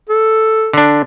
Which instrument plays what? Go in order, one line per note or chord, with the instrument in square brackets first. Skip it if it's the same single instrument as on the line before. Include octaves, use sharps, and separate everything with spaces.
[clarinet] A4
[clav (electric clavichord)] D3 D4